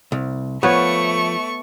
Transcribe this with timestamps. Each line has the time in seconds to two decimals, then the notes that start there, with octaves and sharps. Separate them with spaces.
0.12 C2
0.63 F3 A3 B3 B4 C#5 C#6